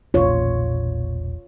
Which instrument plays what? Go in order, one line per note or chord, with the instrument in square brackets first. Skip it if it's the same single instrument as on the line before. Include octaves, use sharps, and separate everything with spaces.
[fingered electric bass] E1 A#1 A#2 [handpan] F4 C#5